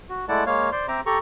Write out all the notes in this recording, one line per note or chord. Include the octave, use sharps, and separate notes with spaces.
F#4
G#3 A3 E4 D5 F#5 A5
G#3 A#3 C#5 F5
C5 D5 C6
C4 C5 E5 A#5 D6
G4 A4 A#5 C#6